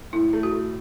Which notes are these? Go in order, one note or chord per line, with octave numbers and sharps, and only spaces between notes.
A2 E4
A3
F#4
A3